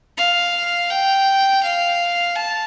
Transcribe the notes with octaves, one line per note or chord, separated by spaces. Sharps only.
F5
G5
F5
A5